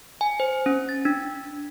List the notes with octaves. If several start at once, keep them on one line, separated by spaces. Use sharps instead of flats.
G#5
C5
C#4
A6
D4